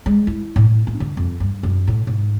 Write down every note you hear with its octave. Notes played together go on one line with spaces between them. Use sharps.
G#3
E4
A2
B3
D3
F2
G2
F#2
A2
G#2